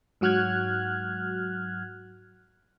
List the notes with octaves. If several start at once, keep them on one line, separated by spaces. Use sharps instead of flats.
G#2 F#3 F#4 F6 F#6 G#6